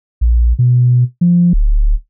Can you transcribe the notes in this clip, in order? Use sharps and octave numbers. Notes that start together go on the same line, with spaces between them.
A#1
B2
F3
D1